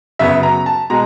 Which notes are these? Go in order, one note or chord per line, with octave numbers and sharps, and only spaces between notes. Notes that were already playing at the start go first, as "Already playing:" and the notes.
F#2 C#3 F#3 B3 E5
A#5
A5
B2 G#3 A#5